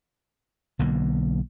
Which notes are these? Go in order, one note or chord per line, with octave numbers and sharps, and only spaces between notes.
B1 D3 A#3